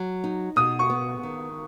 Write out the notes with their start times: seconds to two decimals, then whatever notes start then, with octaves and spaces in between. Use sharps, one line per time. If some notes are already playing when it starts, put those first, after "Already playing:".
Already playing: F#3
0.24 D#4
0.56 B2 D#6
0.79 C#6
0.90 B3
1.23 D#3